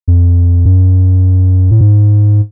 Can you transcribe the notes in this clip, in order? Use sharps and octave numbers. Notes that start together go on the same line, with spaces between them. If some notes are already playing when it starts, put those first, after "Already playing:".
F2
F#2
A2
G#2